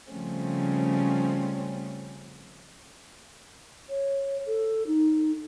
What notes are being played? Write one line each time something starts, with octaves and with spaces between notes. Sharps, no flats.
C#3 F3 G3 A3 C4 C#4
C#5
A4
D#4